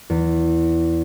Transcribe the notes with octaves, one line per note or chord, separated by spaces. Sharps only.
E2